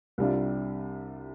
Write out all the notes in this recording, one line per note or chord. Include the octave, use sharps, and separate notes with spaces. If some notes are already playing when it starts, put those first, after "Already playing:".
C2 C3 G3 D4 F4